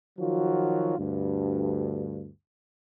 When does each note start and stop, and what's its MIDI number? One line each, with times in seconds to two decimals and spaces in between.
0.19 0.95 51
0.19 0.95 53
0.19 0.95 54
0.19 0.95 65
0.19 0.95 66
0.98 2.29 38
0.98 2.29 43